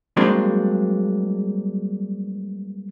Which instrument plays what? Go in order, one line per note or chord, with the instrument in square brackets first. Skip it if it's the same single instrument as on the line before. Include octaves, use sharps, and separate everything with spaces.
[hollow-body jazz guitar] G2 F#3 G#3 A#3 C4 D4